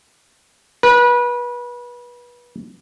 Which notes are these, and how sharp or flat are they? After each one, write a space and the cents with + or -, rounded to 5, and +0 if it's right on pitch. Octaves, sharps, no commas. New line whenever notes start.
B4 -30